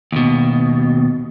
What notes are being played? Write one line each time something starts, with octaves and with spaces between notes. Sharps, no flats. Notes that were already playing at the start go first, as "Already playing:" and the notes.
D#2 B2